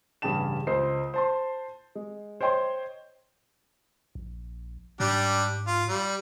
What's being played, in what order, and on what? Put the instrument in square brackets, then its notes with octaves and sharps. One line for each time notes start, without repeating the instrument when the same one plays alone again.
[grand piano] A1 G2 C#3 G4 A5 E7
C#2 C5 C7
C5 A5 C6
G#3
C5 C#5 D#5 G5 C6
[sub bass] A#1
[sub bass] G#2 [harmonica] G3 D4 G4
[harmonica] F4
G3